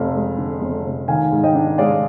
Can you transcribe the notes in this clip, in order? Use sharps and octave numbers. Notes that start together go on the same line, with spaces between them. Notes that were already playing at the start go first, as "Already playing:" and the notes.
Already playing: F1 F2 F5
G#3
D3
F2
F1
D#3 F5 G#5
G#2
D#5 G5
D4
G#3 D5 F5